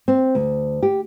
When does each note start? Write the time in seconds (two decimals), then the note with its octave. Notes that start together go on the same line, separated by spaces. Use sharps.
0.08 C4
0.35 D2
0.83 G4